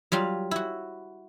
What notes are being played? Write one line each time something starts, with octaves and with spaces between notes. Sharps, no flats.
F#3 G3 F4
E4 F#4